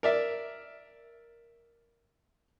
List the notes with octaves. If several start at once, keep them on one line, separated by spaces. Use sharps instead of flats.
A#4 D5 E5